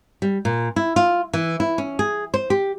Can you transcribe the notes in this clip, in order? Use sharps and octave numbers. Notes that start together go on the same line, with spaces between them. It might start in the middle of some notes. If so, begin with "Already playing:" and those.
G3
A#2
E4
F4
E3
E4
C#4
G#4
C5
G4